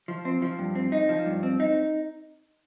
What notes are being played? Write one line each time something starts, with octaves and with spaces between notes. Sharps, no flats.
F3
C4
F3
G2
C4
D#4
F3
G2
C4
D#4